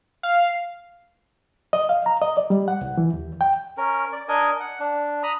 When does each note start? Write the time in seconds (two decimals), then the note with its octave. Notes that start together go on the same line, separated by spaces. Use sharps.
0.23 F5
1.73 D#5
1.89 F5
2.06 A#5
2.22 D#5
2.37 D5
2.50 G3
2.68 F#5
2.81 C2
2.98 E3
3.14 D#2
3.41 G5
3.77 C#4 A#4
4.12 D5
4.28 D4 A#4 D#5 G#5
4.60 F#5
4.80 D4
5.23 A#5 B5 D#6